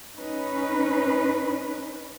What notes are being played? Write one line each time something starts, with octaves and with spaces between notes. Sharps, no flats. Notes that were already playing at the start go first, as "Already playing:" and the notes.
C#4 D#4 B4